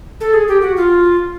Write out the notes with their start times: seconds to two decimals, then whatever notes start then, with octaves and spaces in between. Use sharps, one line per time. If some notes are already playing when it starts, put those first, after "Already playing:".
0.20 A4
0.33 G#4
0.48 G4
0.62 F#4
0.76 F4